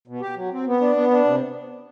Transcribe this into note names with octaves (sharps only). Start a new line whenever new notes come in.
B2
G4
F#3
C4
B3
D4
B3
D4
C3